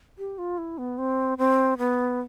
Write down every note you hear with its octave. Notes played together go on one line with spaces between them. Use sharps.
G4
F4
E4
B3
C4
C4
B3